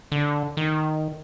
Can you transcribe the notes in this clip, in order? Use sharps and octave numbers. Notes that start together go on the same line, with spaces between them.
D3
D#3